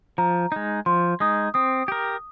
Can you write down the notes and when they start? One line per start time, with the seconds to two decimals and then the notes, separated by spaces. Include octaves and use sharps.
0.18 F3 A#5
0.52 G#3 D#4
0.86 F3 C6
1.20 G#3 D#4 D#6
1.54 C4 D#6
1.88 G4 A#4